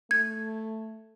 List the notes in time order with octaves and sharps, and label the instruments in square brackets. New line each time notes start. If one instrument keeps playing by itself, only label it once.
[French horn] A3 [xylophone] G#6